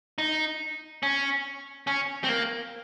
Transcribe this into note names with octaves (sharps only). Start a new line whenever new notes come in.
D#4
C#4
C#4
C4
A#3